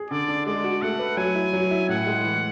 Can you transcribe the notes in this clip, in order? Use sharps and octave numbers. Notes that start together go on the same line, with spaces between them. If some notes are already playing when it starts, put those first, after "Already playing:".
Already playing: G#4
D3 D5
D4
G#3 D5
F#4
A3 F#5
B4
F#3 G#5
E4
F#3
E4
A2 F#5
G#3
E3